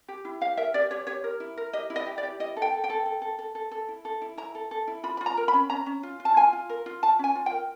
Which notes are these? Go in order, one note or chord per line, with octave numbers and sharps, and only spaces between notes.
G4
E4
G4 F5
A#4 E5
G4 D5
G4 C#5
G4 C#5
A#4
E4
A#4
G4 D#5
E4
D#5
G4
D5
G4
E4 D#5
A4
G5
A4
G5
A4
A4
A4
A4
A4
A4
E4
A4
E4
E4 A#5
A4
A4
E4
F4 B5
B5
F4
A#5
A#4
B5
C#4
C#4 A#5
C#4
F4
F4
A5
F4 G#5
F4
A#4
F4
F4 A5
C#4 G#5
F4
G5
A#4